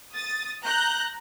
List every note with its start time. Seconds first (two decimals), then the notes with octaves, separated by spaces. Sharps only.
0.14 D#6 A6
0.65 A#5 F#6 G6